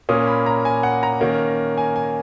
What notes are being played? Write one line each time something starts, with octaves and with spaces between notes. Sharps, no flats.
A#2 A#3 C#4 D#6
B5
A#5
G#5
F#5
A#5
D#3 A#3 C#4
G#5
G#5